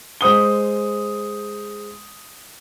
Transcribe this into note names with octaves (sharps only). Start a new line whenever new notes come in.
G#3 C5 D#6 G7